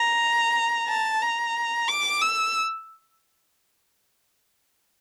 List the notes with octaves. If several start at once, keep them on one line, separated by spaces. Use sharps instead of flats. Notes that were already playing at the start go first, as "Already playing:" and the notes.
Already playing: A#5
A5
A#5
D6
E6